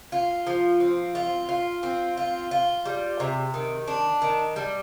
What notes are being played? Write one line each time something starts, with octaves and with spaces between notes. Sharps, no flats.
F4
F3
C4
F4
F4
C4
F4
F4
G3
C3
D#3
D4
D#3
G3